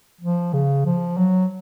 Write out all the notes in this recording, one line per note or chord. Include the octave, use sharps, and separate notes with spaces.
F3
C#3
F3
F#3